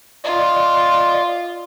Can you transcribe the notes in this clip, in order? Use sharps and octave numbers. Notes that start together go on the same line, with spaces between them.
F4 D5 D#5